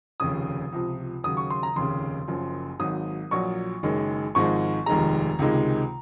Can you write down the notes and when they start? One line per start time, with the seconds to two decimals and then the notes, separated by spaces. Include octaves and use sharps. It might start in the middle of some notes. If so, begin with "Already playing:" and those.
0.20 F1 D#2 C#3 D#6
0.72 C#2 C3 F3
1.24 D#2 C#3 F#3 D#6
1.37 C#6
1.50 C6
1.63 A#5
1.76 F1 D#2 C#3 C6
2.27 F#1 F#2 F3
2.79 G#1 G#2 F#3 D#6
3.31 A#1 A#2 F#3 C#6
3.83 F#1 F#2 D#3 G#3
4.35 G#1 G#2 F3 G#3 C#6
4.86 F1 D#2 D#3 G#3 A#5
5.39 C#2 C3 D#3 G#3